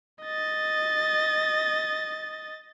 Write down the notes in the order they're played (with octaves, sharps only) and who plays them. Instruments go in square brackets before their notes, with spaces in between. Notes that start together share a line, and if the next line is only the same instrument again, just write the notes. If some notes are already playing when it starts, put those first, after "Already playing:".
[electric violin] D#5 A6